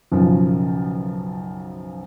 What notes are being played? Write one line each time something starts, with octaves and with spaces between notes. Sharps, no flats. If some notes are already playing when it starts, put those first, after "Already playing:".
B1 F#2 C#3 F3